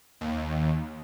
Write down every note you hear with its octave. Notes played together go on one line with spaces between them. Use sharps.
D#2